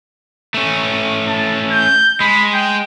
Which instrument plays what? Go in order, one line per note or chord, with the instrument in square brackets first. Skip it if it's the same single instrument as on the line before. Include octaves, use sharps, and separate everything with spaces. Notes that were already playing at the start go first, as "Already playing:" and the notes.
[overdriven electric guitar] A3 C#4
[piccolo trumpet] A5
G6
[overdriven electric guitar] G#3 [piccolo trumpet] B5
[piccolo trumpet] G5